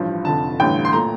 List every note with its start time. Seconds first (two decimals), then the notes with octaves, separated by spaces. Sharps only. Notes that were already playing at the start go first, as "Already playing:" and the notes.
Already playing: A1 G2 F3
0.25 F1 F2 D3 A5
0.60 A1 G2 D3 A3 G5
0.85 C6
0.93 A#2 A3 A#5